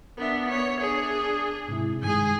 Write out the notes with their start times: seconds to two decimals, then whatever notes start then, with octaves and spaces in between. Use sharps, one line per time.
0.18 B3 D4 A#4 E5
0.50 C#5
0.80 D4 G#4
1.68 G#2 C3 E4
2.03 G2 D#3 G#3 G#4 G#5